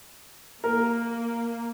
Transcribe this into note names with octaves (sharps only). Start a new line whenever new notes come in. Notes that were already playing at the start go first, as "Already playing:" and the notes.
A#3 A#4